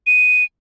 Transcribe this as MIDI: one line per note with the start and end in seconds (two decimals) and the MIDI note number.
0.07 0.44 99